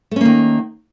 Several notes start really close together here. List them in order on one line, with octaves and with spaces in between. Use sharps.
A3 C#4 A#3 D#3